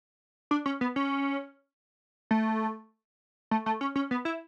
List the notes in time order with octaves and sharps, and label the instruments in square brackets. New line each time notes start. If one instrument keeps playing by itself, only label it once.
[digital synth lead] D4
C#4
B3
C#4
A3
A3
A3
C#4
C#4
B3
E4